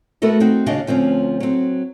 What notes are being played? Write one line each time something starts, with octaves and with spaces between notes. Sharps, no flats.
A3 B3 F#4 A4 A#4
C4 D#4 F#4
D#2 C#3 D4 F#4 D#5 F5
D2 F3 C4 C#4
F#3 C4